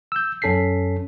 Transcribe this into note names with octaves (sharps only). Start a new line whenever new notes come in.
E6 G6
F#2 C#4 A4 B6 C7